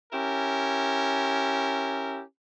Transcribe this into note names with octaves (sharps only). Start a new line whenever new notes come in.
C#4 E4 G4 A#4